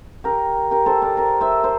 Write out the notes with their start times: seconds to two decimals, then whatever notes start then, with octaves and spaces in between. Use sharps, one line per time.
0.24 G4 A#4
0.71 G4 A#4
0.86 A4 C5
1.02 A#4 D5
1.17 A#4 D5
1.41 C5 E5
1.64 C5